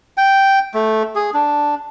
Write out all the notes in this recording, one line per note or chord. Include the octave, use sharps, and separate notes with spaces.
G5
A3
G#4
D4